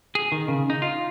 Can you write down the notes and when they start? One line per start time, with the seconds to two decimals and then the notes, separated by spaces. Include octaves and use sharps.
0.15 G#4
0.32 D#3
0.48 C#3
0.70 D#4
0.82 F4